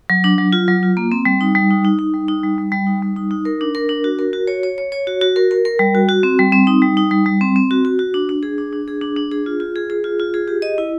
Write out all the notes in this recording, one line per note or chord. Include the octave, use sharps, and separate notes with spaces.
F#3
D4
F#3
F4
F#3
F4
A#3
C4
G3
D#4
G3
D#4
D#4
D#4
G3
D#4
G3
G3
G3
D#4
G3
D#4
D#4
A#4
D4
A#4
D4
F#4
A#4
F#4
C#5
C#5
C#5
C#5
F#4
F#4
A#4
A#4
A#4
G3
F#4
F#4
C4
G3
C4
D#4
G3
D#4
G3
G3
C4
C4
F#4
F#4
F#4
D4
D4
G#4
D4
D4
G#4
D4
D4
G#4
F4
F4
G#4
G#4
F4
F4
G#4
G4
D#5
E4